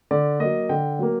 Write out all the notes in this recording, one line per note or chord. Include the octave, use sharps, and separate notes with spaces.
D3 D5
F#3 A#3 D#5
D3 G5
F#3 A#3